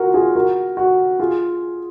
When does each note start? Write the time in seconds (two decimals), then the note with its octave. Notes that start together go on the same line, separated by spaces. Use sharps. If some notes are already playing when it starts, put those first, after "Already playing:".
Already playing: F4 F#4 A#4
0.14 F4 G#4
0.36 F#4 A#4
0.77 F#4
1.19 F4 G#4